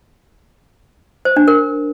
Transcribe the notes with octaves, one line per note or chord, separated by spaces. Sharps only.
C5
D4
A#4